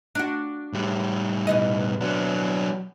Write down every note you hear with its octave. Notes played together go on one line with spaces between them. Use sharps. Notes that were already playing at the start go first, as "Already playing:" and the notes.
D4 F4 F#4
A2 G3
B2 E3 D#5
F#3 D4